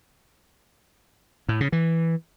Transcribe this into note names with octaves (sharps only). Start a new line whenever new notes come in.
A2
C#3
E3